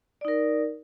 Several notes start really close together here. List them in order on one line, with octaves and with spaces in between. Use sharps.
D5 D#4 A#4